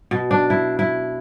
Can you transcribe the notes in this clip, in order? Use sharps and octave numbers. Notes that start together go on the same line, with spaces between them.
B2
D4
E4
E4